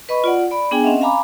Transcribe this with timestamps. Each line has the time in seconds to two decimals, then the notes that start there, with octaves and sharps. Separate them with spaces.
0.09 B4 D#5 B5 C#6
0.24 F4 D5 F#5
0.51 D5 B5
0.71 B3 D4 G#4 G5 G#5
0.83 C4 C#4 D#5 E5 F#5
1.01 F5 G#5 A#5 B5 D6